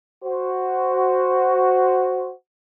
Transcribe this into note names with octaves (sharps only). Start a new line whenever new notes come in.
F#4 C5